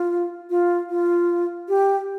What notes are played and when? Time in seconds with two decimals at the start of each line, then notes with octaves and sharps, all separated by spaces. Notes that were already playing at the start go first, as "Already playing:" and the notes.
Already playing: F4
0.50 F4
0.89 F4
1.69 G4